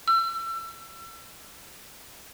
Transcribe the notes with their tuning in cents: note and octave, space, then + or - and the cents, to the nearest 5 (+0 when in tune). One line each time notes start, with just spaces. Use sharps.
E6 +35